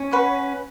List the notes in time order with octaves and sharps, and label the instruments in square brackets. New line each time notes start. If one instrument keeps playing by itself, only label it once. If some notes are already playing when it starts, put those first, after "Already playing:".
Already playing: [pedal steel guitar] C#4
[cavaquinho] B4 F#5 C#6